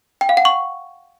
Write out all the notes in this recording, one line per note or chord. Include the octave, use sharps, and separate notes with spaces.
G5
F5
F#5
C#6